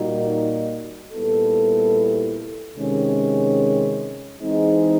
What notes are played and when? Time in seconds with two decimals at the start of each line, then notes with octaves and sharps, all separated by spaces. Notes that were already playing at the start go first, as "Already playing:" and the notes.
Already playing: A#2 G3 A#3 D#4 F#4
1.13 A#2 G3 B3 E4 A4
2.77 C3 D#3 G#3 C#4
4.40 E3 G#3 C4 D#4 G#4